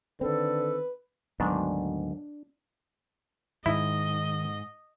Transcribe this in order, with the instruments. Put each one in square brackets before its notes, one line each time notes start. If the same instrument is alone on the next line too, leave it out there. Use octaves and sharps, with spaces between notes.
[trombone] D3 [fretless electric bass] D#3 C4 [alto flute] A4 [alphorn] B4
[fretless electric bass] D2 F#3 B3 [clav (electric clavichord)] G#2 D#3 [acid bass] D4
[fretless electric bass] G#2 [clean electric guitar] D#3 [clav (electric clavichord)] E4 [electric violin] D#5